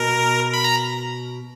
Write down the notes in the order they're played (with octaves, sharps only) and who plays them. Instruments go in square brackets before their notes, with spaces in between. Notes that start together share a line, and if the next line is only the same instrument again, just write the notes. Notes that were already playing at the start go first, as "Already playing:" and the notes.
Already playing: [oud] B2 [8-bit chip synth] A#4
[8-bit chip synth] B5
A#5